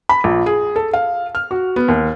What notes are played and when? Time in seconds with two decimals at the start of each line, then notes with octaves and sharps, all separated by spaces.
0.09 B5
0.24 A#1
0.46 G#4
0.76 A4
0.93 F5
1.35 F6
1.51 F#4
1.76 B3
1.88 D#2